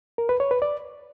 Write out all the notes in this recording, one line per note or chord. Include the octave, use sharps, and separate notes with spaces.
A#4
B4
C#5
B4
D5